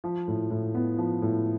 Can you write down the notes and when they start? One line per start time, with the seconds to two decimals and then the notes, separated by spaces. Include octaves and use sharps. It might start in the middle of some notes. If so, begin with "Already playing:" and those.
0.04 F3
0.28 A2
0.50 A2
0.75 B3
0.98 F3
1.22 A2